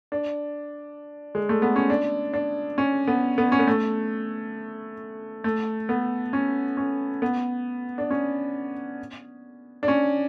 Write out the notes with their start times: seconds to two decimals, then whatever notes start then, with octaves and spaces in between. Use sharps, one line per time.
0.12 D4
1.35 G#3
1.49 A3
1.62 B3
1.76 C#4
1.90 D4
2.33 D4
2.78 C#4
3.08 B3
3.38 B3
3.52 C#4
3.59 B3
3.67 A3
5.44 A3
5.89 B3
6.33 C#4
6.77 C#4
7.22 B3
7.98 D4
8.10 C#4
9.83 D4
9.88 C#4